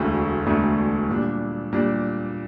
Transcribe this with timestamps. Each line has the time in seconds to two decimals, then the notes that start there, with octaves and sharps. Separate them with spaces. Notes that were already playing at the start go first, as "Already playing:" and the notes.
Already playing: E1 D2 D3 A3
0.46 E1 D2 D3 A3
1.09 A#2 G3 D4
1.72 A#2 G3 D4